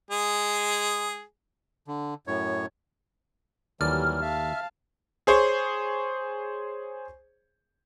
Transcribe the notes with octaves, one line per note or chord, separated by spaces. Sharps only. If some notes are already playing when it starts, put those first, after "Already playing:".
G#3 G#4
D3
F#2 A2 C#5
D#2 E3 F#3 G3 A4 D5 F6
E5 F5 A5
G#4 C5 C#5